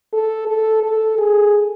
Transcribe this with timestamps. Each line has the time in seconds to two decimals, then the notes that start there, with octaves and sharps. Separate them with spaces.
0.13 A4
0.47 A4
0.83 A4
1.18 G#4